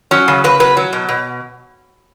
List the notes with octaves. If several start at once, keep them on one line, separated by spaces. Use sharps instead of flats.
F#3 C#4
C#3
C#3 B4
F#3 B4
F#3
B2
B2